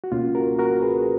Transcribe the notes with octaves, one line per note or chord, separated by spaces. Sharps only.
F#4
C#2 B2 A#3 C#4 F4
F#4 A#4
F#4 A#4
G#4 B4